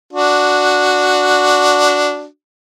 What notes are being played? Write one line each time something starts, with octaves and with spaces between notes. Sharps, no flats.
D4 F#4